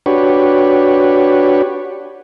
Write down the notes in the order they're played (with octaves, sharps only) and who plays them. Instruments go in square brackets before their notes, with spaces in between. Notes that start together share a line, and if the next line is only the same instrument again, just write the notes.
[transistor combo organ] D4 F#4 G4 B4 C#5